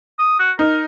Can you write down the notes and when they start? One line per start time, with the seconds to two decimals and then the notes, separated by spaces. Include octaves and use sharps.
0.19 D#6
0.39 F#4
0.59 D#4 A#4